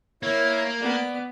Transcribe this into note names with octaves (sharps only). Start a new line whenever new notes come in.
A#3 E4 C#5
B3 D5